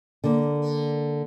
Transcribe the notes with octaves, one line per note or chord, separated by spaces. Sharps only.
D3 A#3